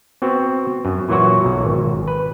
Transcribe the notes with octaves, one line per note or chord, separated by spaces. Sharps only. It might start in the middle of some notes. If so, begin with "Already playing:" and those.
B3 C4 F#4
F#2
A#2 E3 F#3 F#4
B1
G#1
B4